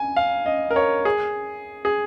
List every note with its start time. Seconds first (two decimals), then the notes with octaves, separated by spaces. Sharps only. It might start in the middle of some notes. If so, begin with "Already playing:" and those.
Already playing: G#5
0.16 F5
0.46 D#5
0.71 A#4
0.76 C#5
1.05 G#4
1.85 G#4